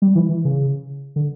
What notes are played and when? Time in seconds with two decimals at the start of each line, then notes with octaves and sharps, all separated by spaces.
0.02 G3
0.15 E3
0.29 E3
0.45 C#3
1.16 D3